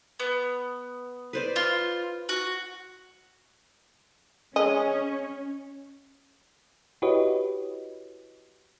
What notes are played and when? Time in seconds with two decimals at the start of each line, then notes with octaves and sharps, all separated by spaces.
0.20 B3
1.33 B4 C5 D5
1.56 F4
2.29 F#4
4.56 G#3 C#4 C#5 D#5
7.02 E4 F#4 G4 B4 C#5 D#5